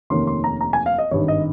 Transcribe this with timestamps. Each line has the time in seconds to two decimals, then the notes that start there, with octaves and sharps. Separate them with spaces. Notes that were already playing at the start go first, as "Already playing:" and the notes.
0.10 F1 D#2 D#3 A#3 C#4 C6
0.27 C6
0.44 A#5
0.61 A#5
0.73 G#5
0.86 F5
0.98 D#5
1.11 G#1 G2 D#3 C#5
1.28 D#5